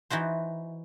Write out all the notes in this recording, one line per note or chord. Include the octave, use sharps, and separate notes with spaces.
E3 D#4 F#4 C5